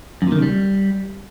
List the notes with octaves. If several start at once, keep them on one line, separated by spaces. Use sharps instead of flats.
F#2
A#2
D#3
C#3
G3